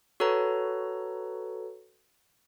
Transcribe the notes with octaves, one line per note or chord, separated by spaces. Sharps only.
F#4 A4 B4 C#5 A#5